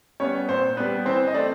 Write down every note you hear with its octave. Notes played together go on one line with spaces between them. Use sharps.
G3 B3 C#4 D4 C#5
A#2 C4 C5
G3 B3 D4 B4
E3 C4 C5
D#5
A3 C4 D4 D5